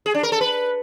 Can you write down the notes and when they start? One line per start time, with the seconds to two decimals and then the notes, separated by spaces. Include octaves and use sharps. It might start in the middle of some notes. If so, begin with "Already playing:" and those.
0.06 G#4
0.15 D4
0.23 A#4
0.32 A4
0.41 B4